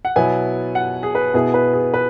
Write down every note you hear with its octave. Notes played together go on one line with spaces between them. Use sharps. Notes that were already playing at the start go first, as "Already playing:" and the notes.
F#5
B2 F#3 B3 E4 G#5
F#5
G#4
B4
B2 B3 E4 G#4
B4
G#4
B4